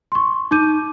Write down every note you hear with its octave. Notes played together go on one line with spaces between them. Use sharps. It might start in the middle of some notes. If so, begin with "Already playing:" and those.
C6 C#6
D#4 D6 G6 D#7